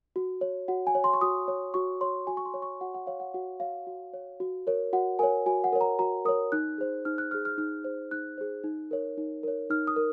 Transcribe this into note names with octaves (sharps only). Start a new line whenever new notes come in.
F#4
C#5
F#4 F#5
G#5
C#5
C6
C#6
F#4 D#6
C#5
F#4 C#6
C#5 C6
F#4 G#5
C#6
C6
C#5
C#6
F#4 F#5
F#5
C#5 F5
F#5
F#4 F#5
C#5 F5
F#4
C#5
F#4
A#4 C#5
F#4 F#5
A#4 C#5 G#5
F#4 G#5
F#5
A#4 C#5
A#5
F#4 A#5
A#4 C#5 D#6
D#4 F#6
G#4 C5
D#4 F6
F#6
G#4 C5 F6
F6
D#4 F6
G#4 C5
D#4 F#6
G#4 C5
D#4
A#4 C#5
D#4
A#4 C#5
D#4 F6
D#6
A#4